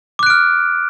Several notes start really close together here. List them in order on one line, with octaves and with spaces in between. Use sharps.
D6 F#6 D7 F6